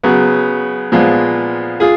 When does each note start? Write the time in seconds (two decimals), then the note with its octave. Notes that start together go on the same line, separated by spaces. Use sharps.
0.03 C#3 F#3 B3
0.92 A#2 F3 G#3 B3 F4
1.80 F4 G#4